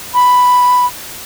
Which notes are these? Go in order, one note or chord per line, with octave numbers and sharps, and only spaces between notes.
B5